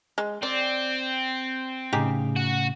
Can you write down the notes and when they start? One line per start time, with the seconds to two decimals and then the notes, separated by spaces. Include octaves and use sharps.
0.18 G#3
0.43 C4 D5
1.93 A2 C#3 D#4 G4 G#4
2.36 F#4